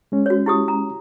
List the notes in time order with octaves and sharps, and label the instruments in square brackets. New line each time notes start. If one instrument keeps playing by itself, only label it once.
[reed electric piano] G#3 C#4
[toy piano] F#4 C#5
E4 G4 D#6
A#5